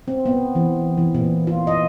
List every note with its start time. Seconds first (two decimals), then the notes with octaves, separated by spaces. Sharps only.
0.08 C4
0.26 B3
0.55 E3
0.98 E3
1.15 A#2
1.47 F4
1.67 D#5